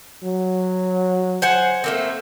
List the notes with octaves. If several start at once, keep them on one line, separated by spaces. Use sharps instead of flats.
F#3
C5 F#5 G#5
A3 A#3 C4